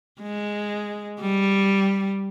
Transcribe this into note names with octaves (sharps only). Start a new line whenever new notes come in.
G#3
G3